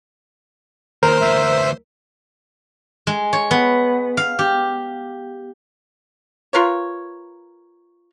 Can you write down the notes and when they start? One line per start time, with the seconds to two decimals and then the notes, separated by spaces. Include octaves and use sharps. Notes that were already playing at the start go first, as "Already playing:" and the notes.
1.03 D#2 A#4 C5
1.21 D2 E3 E5
3.07 G#3
3.33 C#5
3.51 B3
4.17 F5
4.39 G4
6.53 F4 A#4 B4 C#5